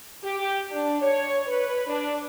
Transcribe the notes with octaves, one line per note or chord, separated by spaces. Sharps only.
G4
D4
C#5
B4
D4